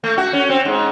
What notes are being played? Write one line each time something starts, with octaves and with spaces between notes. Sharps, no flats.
A3
F#4
C#4
C4
G#2